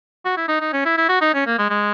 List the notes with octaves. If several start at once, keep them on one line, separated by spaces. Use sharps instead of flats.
F#4
E4
D#4
D#4
C#4
E4
E4
F#4
D#4
C#4
A#3
G#3
G#3